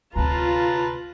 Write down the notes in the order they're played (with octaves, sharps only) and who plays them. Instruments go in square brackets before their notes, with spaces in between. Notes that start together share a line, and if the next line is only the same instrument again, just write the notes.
[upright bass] D2 C3 [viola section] F4 [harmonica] B4 A5 A#5